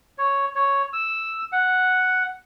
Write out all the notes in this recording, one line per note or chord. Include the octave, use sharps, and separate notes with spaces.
C#5
C#5
E6
F#5